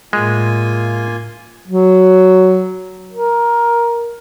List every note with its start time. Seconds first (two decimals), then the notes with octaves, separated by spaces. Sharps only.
0.13 A2 G#3 A#3 F4 G#5
1.67 F#3
3.12 A#4